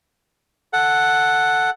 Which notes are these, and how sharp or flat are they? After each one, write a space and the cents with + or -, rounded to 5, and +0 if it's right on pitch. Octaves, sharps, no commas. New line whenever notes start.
A4 +0 F#5 +0